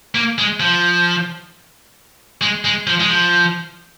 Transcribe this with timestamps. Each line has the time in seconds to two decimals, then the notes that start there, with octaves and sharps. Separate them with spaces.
0.15 A#3
0.38 G#3
0.60 F3
2.41 G#3
2.65 G#3
2.87 F3
3.00 G#3
3.09 F3